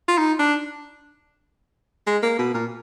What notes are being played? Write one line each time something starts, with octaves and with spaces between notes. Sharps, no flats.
F4
D#4
D4
G#3
A#3
B2
A#2